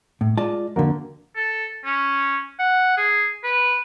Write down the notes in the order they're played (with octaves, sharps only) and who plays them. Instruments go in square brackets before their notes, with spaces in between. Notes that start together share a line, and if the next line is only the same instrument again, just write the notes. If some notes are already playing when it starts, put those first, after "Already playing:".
[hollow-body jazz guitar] A2
[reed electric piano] G#3 D5 [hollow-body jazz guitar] F4 D#5 A5
[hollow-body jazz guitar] F2 D3 [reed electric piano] A#3 F#4 A#4
[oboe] A4
C#4
F#5
G#4
B4